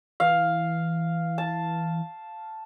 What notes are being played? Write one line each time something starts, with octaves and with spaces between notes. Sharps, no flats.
E3 F5
A5